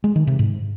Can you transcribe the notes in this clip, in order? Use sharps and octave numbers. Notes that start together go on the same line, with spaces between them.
G#3
D#3
C3
G#2